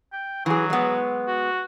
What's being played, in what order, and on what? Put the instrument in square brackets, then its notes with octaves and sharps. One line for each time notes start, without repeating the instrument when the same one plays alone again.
[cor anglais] G5
[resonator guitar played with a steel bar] E3 G#4 [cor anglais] F#3
[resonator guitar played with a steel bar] G#3 B3
[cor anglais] F#4